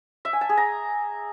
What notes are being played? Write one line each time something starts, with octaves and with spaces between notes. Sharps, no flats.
E5
G#5
A5
G#4
A#5